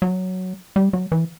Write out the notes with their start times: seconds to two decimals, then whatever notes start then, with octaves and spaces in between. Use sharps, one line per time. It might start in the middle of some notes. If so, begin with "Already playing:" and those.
0.02 F#3
0.76 G3
0.93 F#3
1.12 E3